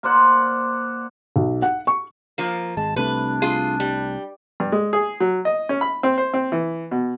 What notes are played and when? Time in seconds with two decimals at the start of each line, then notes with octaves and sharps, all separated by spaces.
0.03 A#3 C5 D5 F#5
1.36 B1
1.62 F#5
1.87 C#6
2.38 F3 A#3
2.77 G#1 G#3 A5
2.96 C2 C3 A3 D4 B4
3.42 F4 G#4
3.80 G3
4.60 G2
4.72 G#3
4.93 G#4
5.20 F#3
5.45 D#5
5.69 C#4
5.81 B5
6.03 C4
6.18 C5
6.34 C4
6.52 E3
6.91 B2